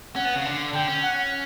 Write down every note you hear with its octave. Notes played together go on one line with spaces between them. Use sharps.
C#4 F#5
B3
C#3
D3
D3 G5
C#4
F#5